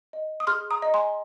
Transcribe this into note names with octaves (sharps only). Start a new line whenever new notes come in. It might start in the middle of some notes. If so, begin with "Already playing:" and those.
D#5
D#6
G#4 C6 F6
A#5 D#6
D#5
G#5 C6